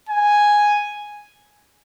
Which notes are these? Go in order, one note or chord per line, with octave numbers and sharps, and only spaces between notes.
G#5